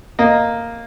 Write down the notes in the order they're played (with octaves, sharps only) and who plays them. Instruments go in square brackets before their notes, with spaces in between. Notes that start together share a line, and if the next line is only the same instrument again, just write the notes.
[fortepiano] A#3 D#5